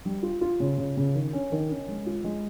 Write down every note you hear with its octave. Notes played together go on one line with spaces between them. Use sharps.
G3
F4
F4
C#3
C#3
C#3
D#3
C#4
D#3
C#4
G#3
F4
G#3